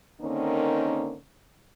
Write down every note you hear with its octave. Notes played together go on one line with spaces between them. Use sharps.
D3 D#3 A#3 C4 C#4 D#4